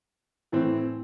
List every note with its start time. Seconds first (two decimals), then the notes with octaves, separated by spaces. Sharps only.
0.52 A2 E3 C4